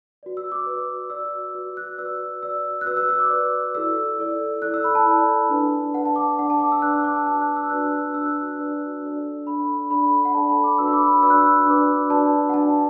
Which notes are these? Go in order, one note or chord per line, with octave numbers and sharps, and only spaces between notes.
F#4 B4 D5
E6
D6
F#4 B4 D5
F#4 B4 D5 E6
F#4 B4 D5
F#6
F#4 B4 D5 E6
F#4 B4 D5 E6
F#6
F#4 B4 D5 E6
E6
E6
D6
F#4 B4 D5
E4 A4 D5 E6
E4 A4 D5
E4 A4 D5 F#6
E6
B5
A5
E4 A4 D5
D4 B4 D5
D4 B4 D5 F#5
A5
D6
D4 B4 D5 F#5
A5
D6
E6
D4 B4 D5 F#6
E6
D6
A5
D4 F#4 B4 D5 A5
F#6
E6
D4 F#4 B4 D5 F#6
E6
D4 F#4 B4 D5 E6
F#6
E6
D4 F#4 B4 D5
D4 A4 D5
D4 A4 D5 B5
D4 A4 D5 B5
F#5
D4 A4 D5 A5
B5
D6
D4 F#4 B4 D5 E6
B5
D6
B5
D4 F#4 B4 D5 E6
F#6
E6
D4 F#4 B4 D5 D6
D4 F#4 B4 D5 A5
F#5
D4 B4 D5 A5